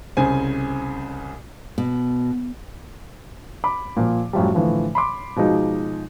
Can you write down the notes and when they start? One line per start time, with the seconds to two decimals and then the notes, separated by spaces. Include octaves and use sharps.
0.17 C2 C#3 C5 G#5
1.78 B2
3.64 B5 D6
3.97 A#2 F3
4.33 F#2 A2 F3 G3
4.55 A2 D3 E3 F3
4.95 B5 C6 D6
5.36 B2 F3 G#3 D#4